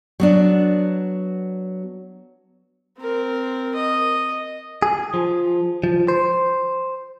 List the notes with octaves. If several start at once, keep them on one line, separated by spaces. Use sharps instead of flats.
F#3 B3 D4
C4 A#4
D#5
G#4
F3
F3
C5